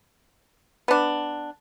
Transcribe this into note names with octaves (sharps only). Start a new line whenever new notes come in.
B3 D4